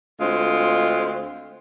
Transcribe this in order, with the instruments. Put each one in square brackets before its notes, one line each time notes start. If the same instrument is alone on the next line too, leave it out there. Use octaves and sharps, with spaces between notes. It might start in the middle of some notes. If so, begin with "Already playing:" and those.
[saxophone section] D2 G#3 C4 F4